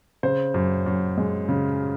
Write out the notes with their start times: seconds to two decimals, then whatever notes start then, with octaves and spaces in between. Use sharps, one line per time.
0.23 C#3 C5
0.54 F#2
0.86 F#2
1.18 G#3
1.49 C#3